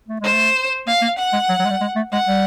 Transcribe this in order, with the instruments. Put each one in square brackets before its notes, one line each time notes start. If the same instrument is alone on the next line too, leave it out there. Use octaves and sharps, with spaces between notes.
[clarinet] A3
[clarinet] G#3 [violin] C5
[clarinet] A3
[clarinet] A#3 [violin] F5
[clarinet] A#3
[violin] F#5
[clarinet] G#3
F#3
F#3
G#3
G3
G#3
A3
[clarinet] G#3 [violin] F#5
[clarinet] G3